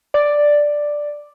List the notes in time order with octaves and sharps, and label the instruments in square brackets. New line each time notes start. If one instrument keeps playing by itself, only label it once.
[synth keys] D5